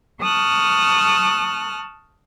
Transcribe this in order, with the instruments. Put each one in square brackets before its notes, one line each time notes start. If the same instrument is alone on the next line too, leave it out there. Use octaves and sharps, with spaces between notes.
[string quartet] A5 C#6 D#6 F6 F#6